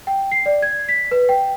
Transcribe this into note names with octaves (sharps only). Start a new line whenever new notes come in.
G5
C7
D5
G#6
B6
B4
G5